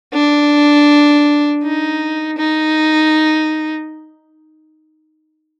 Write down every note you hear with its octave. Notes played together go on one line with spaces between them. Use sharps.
D4
D#4
D#4